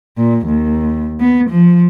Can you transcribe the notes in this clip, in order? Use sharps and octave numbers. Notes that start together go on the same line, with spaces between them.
A#2
D#2
B3
F3